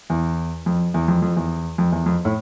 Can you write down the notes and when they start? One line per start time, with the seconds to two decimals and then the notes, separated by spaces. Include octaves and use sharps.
0.10 E2
0.66 F2
0.94 E2
1.08 F2
1.22 F2
1.36 E2
1.78 F2
1.92 E2
2.06 F2
2.25 A2